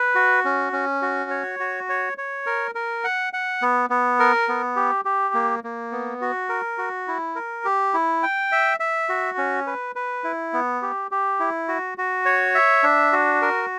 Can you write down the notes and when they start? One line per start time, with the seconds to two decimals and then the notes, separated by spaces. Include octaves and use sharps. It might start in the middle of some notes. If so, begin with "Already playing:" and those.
Already playing: B4
0.15 F#4
0.45 C#4
0.73 C#4
1.02 F#4
1.30 C#5
1.59 F#4
1.89 C#5
2.18 C#5
2.46 A#4
2.75 A#4
3.04 F#5
3.33 F#5
3.62 B3
3.90 B3
4.20 A#4
4.48 B3
4.76 G4
5.05 G4
5.34 A#3
5.64 A#3
5.92 B3
6.21 F#4
6.49 A#4
6.78 F#4
7.08 E4
7.35 A#4
7.65 G4
7.94 E4
8.23 G5
8.52 E5
8.80 E5
9.09 F#4
9.38 C#4
9.67 B4
9.96 B4
10.24 E4
10.53 B3
10.82 G4
11.11 G4
11.40 E4
11.68 F#4
11.98 F#4
12.25 C#5
12.55 E5
12.83 D4
13.13 F#4
13.42 A#4